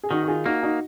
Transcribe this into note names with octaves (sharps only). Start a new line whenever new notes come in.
G#4
D#3 D#4 F#4
F#4
F4 G#4
A#3 D#4 F#4
D#4 F#4